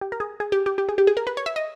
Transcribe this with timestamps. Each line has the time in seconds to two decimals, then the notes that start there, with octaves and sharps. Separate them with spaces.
0.01 G4
0.12 A#4
0.20 G#4
0.40 G#4
0.52 G4
0.66 G4
0.78 G4
0.89 G#4
0.98 G4
1.07 G#4
1.17 A#4
1.27 B4
1.37 C#5
1.46 E5
1.56 D#5